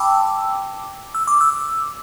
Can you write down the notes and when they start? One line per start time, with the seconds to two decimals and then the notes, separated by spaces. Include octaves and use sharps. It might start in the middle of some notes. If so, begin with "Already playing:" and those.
Already playing: G5 A5 B5 D6 E6
1.15 E6
1.27 D6
1.41 E6